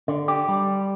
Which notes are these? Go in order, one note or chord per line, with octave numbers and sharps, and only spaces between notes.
D3
G4
G3